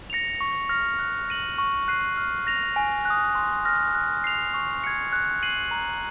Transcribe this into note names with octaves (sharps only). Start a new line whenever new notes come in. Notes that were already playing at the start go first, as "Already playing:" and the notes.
A#6 C#7 F7
C#6
F6 A#6 F7
F#6
A#6 D#7 F#7
C#6
F#6 C7 D#7
F6
A#6 F7
G#5
F#6
D#6
C6
F6 A#6
F#6
C7 F7
C#6
G#6 C#7
F#6
C7 D#7 F#7
A#5